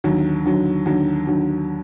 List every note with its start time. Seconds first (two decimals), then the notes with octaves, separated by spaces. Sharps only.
0.04 D#2 D3 F#3
0.45 D#2 D3 F#3
0.86 D#2 D3 F#3
1.27 D#2 D3 F#3